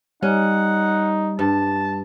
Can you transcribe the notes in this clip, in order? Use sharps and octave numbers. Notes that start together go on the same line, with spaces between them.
G3 C#4 D#4 F#5
G2 A5